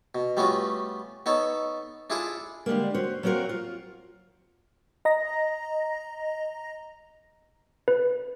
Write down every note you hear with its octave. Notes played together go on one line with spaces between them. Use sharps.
B2
G3 A3 B3 C#4 F4 F#4
B3 D#4 A4 C#5
D4 E4 F4 G#4 A4 D5
D3 G3 G#3 A#3
C#4 F#4 C5
F#3 A#3 C4 F#4 A#4 C5
F4
D#5 A#5 A#6
B4